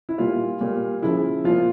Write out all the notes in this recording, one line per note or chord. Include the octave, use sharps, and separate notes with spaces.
E4
A#2 G3 F4
A#2 G3
C#3 F3 E4
A#2 F3 F4